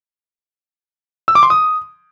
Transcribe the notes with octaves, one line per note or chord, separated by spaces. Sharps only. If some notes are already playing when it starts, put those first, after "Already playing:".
E6
D6
C6
D#6